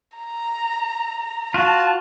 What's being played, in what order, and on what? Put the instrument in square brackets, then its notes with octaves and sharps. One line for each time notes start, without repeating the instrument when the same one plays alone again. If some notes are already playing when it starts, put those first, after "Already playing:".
[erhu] A#5
[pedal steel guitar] F4 F#4 [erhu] A5